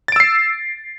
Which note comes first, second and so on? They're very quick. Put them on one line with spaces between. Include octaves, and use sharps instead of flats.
A6 D7 E6 C7